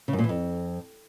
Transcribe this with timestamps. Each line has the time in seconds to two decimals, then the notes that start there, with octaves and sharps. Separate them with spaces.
0.08 C#3
0.13 F#2
0.19 A#2
0.24 E3
0.29 F2